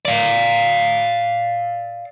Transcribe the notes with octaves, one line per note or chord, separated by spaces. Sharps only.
D5 F5